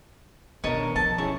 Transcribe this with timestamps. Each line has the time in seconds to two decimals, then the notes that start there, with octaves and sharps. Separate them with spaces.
0.64 B2 D#3 B3 D4 A#4 C#5 D#5 A5
0.96 C2 F3 A4 A5
1.18 C#4 E4 G#4 C#6